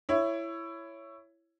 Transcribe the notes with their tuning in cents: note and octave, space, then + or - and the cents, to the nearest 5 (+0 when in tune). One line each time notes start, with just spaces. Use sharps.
E4 +15 C#5 +0